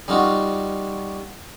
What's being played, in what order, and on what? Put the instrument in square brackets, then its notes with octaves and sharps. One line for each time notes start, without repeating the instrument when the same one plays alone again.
[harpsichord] G3 D#4 F4 F#4